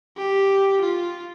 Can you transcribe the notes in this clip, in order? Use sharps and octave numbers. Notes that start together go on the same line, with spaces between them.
G4
F4